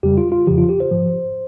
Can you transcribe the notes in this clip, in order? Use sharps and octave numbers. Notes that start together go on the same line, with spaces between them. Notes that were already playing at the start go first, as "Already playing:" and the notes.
F2 C#3 G3 G4
F4
F4
F2 C#3 F3 G4
F4
G4
C5
G#2 F3